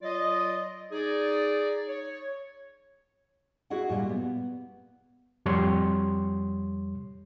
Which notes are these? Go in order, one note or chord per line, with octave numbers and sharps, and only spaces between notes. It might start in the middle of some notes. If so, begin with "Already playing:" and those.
F#3 F4 D5 D#5
D#4 G#4 D5
C#5
E4 F#4 G#4 D#5 F#5
F#2 A#2 G3
B3
F2 G3 C#5 C6